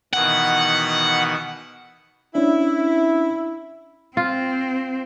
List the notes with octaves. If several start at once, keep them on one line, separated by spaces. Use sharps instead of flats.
B2 D#3 E3 F#5
C#4 D4 E4
C4 F4